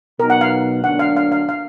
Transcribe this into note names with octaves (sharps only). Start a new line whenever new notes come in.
B2 F#3 B3 D#4 A#4
F#5
F5
D2 D3 F#3 A#3 D4 F#5
F5
F5
F5
F5